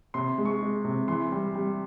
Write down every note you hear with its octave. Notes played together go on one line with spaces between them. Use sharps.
C3 C6
G#3
C#6
G#3
C3
E3 C6
G3
G3